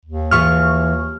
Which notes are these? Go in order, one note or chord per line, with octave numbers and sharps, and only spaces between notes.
D#2
E3 F4 G#4 C#6 F6